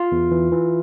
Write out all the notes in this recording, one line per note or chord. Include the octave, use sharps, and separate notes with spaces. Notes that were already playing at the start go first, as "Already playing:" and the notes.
Already playing: F4
E2
E3
E3